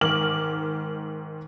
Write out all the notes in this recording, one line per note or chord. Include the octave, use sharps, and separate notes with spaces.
G#2 D#3 D6 F6 F#7